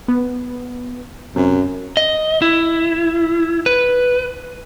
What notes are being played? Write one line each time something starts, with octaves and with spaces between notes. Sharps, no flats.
B3
F#2 C3
D#5
E4
B4